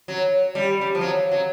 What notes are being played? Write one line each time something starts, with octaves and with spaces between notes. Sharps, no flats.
F#3
G3
G3
F3
F#3
F#3